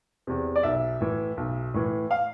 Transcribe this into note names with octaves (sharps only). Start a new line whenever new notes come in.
E2 C3
D5
B1 E5
A2 E3
B1
A2 E3
F5